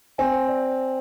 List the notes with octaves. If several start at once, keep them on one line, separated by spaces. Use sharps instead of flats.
C4 G#5
D5